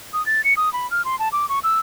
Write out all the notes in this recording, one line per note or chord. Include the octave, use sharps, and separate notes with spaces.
D#6
A6
C#7
D#6
B5
F6
C6
A5
D6
C#6
E6